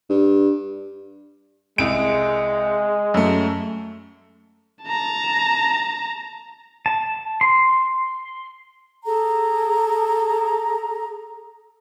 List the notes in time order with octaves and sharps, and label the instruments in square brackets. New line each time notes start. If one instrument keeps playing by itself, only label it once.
[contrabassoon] G2
[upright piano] C2 D7 [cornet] G#3
[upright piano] F#2 A3
[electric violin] A5 A#5
[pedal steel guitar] A5
C6
[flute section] G#4 A4 A#5